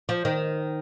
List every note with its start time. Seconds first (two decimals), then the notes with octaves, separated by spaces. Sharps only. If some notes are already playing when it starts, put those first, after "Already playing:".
0.09 F3
0.25 D#3